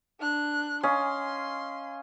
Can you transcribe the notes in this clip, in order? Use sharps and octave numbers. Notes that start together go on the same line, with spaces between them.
D4 F#6
C#4 D#5 F5 C6